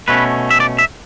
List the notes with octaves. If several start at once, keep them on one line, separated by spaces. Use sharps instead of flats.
B2 A3 C#4 B4
E5
D5
E5